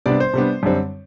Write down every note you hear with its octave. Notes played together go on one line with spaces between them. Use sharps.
C3 G3 B3 D4 D5
C5
C3 G3 B3 D4
F#2 D3 G3 C4